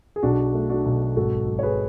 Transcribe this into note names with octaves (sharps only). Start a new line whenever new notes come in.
G#4
B1 D4 F#4
A3
D4 F#4
B1
G#1 F#4 A4
F#3
C#5
G#4 B4